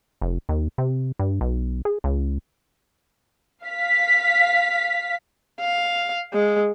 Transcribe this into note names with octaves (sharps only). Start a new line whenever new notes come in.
F1
D#2
C3
G2
B1
G#4
C#2
F5 B6
F5
G#3